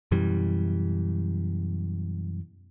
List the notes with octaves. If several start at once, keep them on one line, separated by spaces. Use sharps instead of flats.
F#2 B2 E3 G3